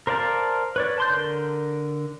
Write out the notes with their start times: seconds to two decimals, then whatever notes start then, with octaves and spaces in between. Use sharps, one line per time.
0.07 A#4 C5 D5 F5 A5
0.76 B4 C#5 D5
0.98 A5 C6 G6
1.10 D3 A#4